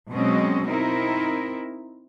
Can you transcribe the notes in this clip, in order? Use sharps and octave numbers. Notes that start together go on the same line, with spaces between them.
B2 F#3 G#3 C4 C#4 D#5
C4 D#4 E4 A#4